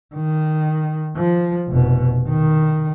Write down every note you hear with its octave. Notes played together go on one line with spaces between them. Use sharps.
D#3
F3
F1 B2
D#3